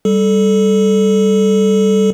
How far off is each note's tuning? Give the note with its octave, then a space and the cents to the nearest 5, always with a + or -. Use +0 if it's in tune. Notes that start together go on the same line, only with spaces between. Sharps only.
G3 +0 A4 -10